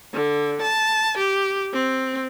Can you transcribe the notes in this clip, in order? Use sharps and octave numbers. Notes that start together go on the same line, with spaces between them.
D3
A5
G4
C4